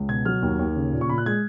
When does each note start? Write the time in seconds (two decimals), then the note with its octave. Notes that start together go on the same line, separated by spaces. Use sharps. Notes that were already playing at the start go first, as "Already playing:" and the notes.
Already playing: C#2
0.09 B2 G#6
0.25 F#3 F6
0.42 D#2
0.59 D#2
0.76 C#3
0.93 A#2
1.01 C#6
1.09 A#2 B5
1.18 F#6
1.26 G#3 G#6